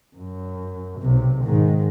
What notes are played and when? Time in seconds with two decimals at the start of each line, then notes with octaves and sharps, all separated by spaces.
0.17 F#2
1.00 B1 C3
1.44 G#2 D#3